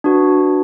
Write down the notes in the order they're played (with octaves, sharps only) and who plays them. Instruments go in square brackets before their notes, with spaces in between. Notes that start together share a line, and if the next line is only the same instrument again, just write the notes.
[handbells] D4 F#4 B4